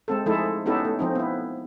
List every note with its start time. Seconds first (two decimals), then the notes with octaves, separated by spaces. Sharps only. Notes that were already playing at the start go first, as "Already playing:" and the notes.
0.08 G#3 C4 A4
0.26 F3 G#3 A3 D#4 E4 A4
0.66 B3 C#4 D#4 E4 G4 A4
0.85 A3
0.99 F3 C4 D#4
1.15 B3 E4